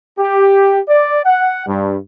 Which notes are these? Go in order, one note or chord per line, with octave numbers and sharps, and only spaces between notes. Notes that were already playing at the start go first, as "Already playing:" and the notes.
G4
D5
F#5
G2